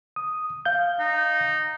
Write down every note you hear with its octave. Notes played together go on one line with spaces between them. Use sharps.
D#6
F5 G6
D#4